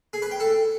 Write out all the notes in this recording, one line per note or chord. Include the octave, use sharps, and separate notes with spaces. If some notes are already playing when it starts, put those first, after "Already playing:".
G#4
B4
G5
A4